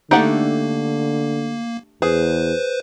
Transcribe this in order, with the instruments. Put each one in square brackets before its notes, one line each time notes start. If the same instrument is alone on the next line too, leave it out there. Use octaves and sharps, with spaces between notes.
[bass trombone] D3 [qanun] A3 D4 G4 [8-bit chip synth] A#3 [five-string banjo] D#4 F#5
[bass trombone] E2 [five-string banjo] G#4 [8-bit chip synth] B4 C5